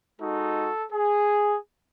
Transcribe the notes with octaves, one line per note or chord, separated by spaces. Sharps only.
G#3 D#4 F#4 A4
G#4